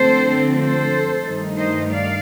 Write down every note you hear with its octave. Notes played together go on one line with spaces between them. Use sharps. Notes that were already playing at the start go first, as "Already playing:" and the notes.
Already playing: D3 F3 A3 C4 A4 C5
A4 C5
G2 D#3 A3 D#4
C5 D#5
D5 F5